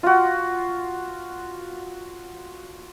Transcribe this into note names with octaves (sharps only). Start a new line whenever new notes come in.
F4 F#4